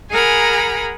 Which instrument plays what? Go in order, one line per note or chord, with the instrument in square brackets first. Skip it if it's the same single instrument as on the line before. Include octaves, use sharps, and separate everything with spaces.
[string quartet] G#4 A#4 F#5 G#5 A#5 B5